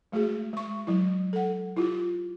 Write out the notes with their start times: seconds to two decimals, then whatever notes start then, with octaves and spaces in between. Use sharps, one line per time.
0.12 G#3 A3 F#4 G#4
0.53 G#3 C#6
0.87 F#3 E4
1.33 A4 F#5
1.77 E4 F4 G4